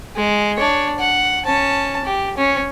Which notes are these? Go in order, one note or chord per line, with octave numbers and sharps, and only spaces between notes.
G#3
D4 C#5
F#5
C#4 A5
G4
C#4